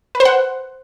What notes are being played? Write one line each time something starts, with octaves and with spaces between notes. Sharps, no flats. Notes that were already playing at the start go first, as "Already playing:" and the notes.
B4
C5
F#5